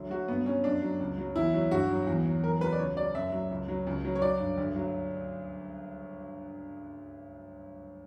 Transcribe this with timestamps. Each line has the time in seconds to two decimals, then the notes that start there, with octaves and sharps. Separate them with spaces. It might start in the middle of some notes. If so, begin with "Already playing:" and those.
Already playing: D2 F#3
0.10 F#3 F#4
0.28 G2 B3
0.46 F#3 C#4
0.64 F#2 D4
0.82 F#3
1.00 C#2
1.18 F#3
1.36 E2 E4
1.54 F#3
1.71 G2 F#4
1.90 F#3
2.07 E2
2.26 F#3
2.43 E2 A#4
2.61 F#3 B4
2.72 D5
2.79 C#2 C#5
2.96 F#3 D5
3.15 F#2 E5
3.32 F#3
3.51 C#2
3.68 F#3
3.87 C#2
4.05 F#3
4.15 C#5
4.22 F#3 D5
4.40 G2
4.57 D2
4.76 F#3